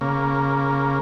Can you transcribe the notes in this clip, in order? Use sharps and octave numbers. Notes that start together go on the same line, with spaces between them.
C#3 A#3